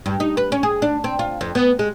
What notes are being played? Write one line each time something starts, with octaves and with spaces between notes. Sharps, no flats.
G2
D#4
B4
C#4
G#4
D4
C4
F4
F2
B3
G#3